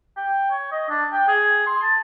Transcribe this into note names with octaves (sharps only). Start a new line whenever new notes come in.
G5
C#5
D#5
D4
G5
G#4
C6
A5